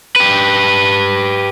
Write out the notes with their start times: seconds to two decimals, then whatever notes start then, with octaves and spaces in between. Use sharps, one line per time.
0.16 G4 B4